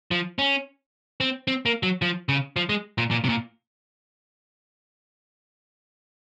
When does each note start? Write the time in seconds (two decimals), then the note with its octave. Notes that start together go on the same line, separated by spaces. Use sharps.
0.11 F3
0.39 C#4
1.20 C4
1.48 C4
1.66 A#3
1.83 F#3
2.02 F3
2.29 C#3
2.56 F3
2.69 G#3
2.98 A#2
3.11 A#2
3.24 C3
3.29 A#2